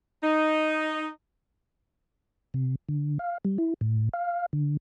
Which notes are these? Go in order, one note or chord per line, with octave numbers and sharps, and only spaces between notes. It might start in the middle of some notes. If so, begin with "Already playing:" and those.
D#4
C3
D3
F5
G3
E4
A2
F5
D3